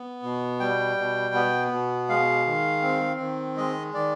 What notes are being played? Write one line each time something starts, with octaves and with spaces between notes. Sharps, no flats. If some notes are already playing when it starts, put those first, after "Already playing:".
Already playing: B3
B2
G3 G5
B2
B3
B2
G#3 F5
D#3
C4
D#3
G#3 D#5
D#3 D5